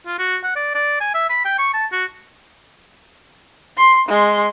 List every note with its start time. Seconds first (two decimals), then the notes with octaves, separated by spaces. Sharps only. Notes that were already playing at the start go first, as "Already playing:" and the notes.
0.07 F4
0.18 F#4
0.44 F#5
0.56 D5
0.75 D5
1.00 G#5
1.14 E5
1.29 B5
1.45 G5
1.58 C#6
1.74 A5
1.92 F#4
3.77 C6
4.09 G#3 C6